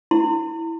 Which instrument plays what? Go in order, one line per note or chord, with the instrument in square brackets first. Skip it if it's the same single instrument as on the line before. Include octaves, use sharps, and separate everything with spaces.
[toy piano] E4